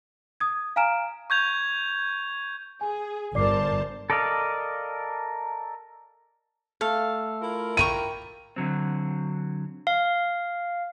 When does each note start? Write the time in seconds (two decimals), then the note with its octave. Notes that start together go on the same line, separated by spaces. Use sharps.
0.40 D#6 G#6
0.76 F5 G#5 A#5 F6 D7 E7
1.30 C#6 G6 G#6 F7
2.81 G#4 G#5
3.35 G1 A#4 C5 D5 A5 D6 C7
4.10 A4 A#4 D5 D#5 F5
6.81 A3 A4 F5
7.41 E4 F4 A#4
7.77 G5 A#5 C#6 D#7
8.56 D3 F#3 C4
9.87 F5